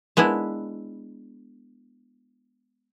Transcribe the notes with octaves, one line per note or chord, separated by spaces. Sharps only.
G#3 B3 D4 E4